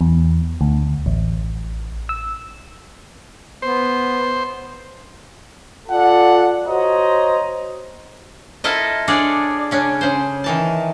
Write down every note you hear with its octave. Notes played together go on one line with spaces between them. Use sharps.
E2
D2
A1
E6
B3 C5
F4 A4 D5 F#5
F#4 C5 C#5 D#5 A#5
E4 F4 A4 A#4 D#5
D4 F4 G#4 A4 C#5 D5
C#3 C#4 D4
C#3 C5
D#3 E3 A5